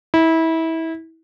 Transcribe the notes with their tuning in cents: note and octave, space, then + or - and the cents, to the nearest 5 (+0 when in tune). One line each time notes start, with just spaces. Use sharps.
E4 -25